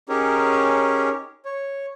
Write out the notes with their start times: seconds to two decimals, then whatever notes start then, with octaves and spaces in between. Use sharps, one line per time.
0.09 C#4 D#4 G4 G#4 A#4 C#5
1.45 C#5